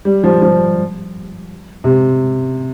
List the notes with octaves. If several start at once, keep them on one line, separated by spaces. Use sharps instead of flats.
G3
F3
F3
C3